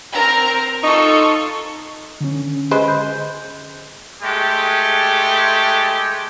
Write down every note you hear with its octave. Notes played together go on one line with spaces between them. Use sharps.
C4 A#4 A#5
D#4 F4 A4 C#6
D3 C#4
G#3 B4 C5
G6
G#3 A3 G4